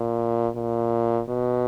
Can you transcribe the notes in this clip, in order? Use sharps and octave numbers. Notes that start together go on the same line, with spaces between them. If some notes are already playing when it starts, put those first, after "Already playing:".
Already playing: A#2
A#2
B2